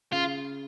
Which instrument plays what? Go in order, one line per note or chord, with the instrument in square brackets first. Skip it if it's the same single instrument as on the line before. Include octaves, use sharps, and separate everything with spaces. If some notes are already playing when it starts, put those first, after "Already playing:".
[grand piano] C#3 [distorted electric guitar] F4